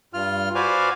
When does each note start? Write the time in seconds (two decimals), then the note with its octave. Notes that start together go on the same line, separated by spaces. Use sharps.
0.14 G2 F4 F6
0.55 F#4 B4 C5 D5 F5 G#5